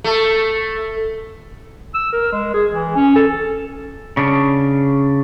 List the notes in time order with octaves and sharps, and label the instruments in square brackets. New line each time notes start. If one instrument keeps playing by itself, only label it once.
[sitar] A3
[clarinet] E6
A#4
G#3
G#4
E3
C#4
A4
[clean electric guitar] C#3 D4